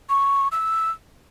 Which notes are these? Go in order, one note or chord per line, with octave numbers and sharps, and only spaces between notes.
C#6
E6